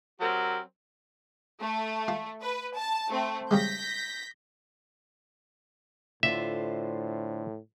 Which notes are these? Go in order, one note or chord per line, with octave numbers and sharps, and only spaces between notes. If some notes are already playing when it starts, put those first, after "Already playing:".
F#3 C4 G4 A#4
A3
F4
B4
A5
A3 C4
C#3 G3 G#3 G6 A#6 B6
A2 D3 F4 C5 E5